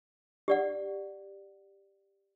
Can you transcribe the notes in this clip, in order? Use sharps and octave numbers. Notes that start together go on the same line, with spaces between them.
G4 D5 F#5